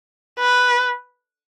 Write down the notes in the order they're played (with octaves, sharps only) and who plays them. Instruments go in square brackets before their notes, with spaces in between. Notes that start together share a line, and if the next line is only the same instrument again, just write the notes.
[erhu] B4